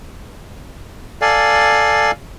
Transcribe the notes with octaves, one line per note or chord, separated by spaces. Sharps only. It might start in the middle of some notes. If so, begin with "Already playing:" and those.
A4 D5 F5 G#5